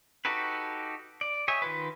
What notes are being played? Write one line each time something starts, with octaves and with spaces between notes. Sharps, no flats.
D#4 F#4 G4 A4 B4
D5
G4 C#5 D#5 E5 G#5
D#3 F4 B4